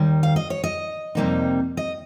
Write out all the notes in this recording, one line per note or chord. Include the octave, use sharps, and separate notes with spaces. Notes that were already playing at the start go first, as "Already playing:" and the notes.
Already playing: D#2 D#3 G3
F5
D#5
C#5
D#5
F2 C3 G3 A#3 D#4
D#5